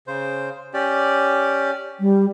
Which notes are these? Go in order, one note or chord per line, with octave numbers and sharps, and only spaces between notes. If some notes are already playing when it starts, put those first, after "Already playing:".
C#3 C5
C#4 G4 D5
G3